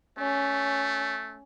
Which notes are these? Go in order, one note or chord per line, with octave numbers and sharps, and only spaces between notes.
A3 C#4